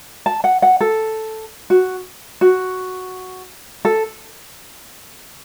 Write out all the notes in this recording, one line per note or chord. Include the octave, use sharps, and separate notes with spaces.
A5
F#5
F#5
A4
F#4
F#4
A4